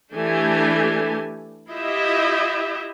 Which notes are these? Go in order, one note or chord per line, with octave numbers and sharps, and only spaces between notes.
E3 A3 D4 G4 A4 G#5
E4 F4 G4 D#5 E5